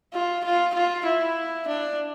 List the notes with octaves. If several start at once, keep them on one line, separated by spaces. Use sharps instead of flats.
F4
F4
F4
E4
D4